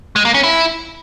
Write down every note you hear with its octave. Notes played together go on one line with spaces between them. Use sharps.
G#3
A#3
C#4
E4